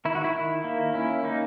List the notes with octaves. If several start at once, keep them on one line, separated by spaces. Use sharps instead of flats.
D#3 E4
F#4
E4
D#3
A#3
C#4 E4
A#3 D#4